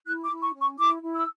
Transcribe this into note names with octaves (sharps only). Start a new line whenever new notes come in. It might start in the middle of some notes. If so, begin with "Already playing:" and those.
E4 F#6
D6
E4
C#6
C#4
C#6
E4 D6
E4
E6